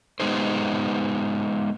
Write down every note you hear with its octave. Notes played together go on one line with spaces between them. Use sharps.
G#3 B3 D#4 G4 C5